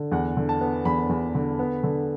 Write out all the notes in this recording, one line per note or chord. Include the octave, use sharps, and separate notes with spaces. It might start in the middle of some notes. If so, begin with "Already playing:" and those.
Already playing: D3
E2 F#5
D3
A5
B3
E2 B5
E2
D3
B3
D3